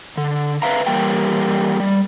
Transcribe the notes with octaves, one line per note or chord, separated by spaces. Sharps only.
D3
B4 E5 F5 A#5
E3 G3 A#3 G4 G5
G3